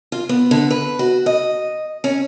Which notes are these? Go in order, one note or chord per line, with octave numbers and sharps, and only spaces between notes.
F4
B3
D3
B4
F#4
D#5
C#4